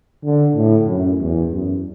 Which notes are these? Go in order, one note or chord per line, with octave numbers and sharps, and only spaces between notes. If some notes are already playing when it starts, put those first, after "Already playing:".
D3
A2
F#2
E2
F#2